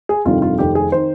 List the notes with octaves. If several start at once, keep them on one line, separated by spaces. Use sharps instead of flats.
G#4
G1 F2 C3 D#3 G3 F4
F4
F1 F2 D#3 G4
G#4
D#3 C5